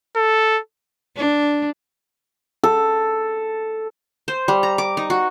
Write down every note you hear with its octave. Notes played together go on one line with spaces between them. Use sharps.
A4
D4
A4
C5
G3
A#5
D6
D#4
F#4